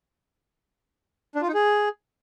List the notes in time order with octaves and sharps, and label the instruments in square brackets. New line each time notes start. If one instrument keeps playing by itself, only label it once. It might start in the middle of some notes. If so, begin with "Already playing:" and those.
[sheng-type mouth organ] D4
F4
D#4
G#4